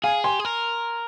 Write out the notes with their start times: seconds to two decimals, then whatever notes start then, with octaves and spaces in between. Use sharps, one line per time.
0.04 G#4 F5 G#5
0.24 G4 G#5 C6
0.39 G#4
0.45 A#4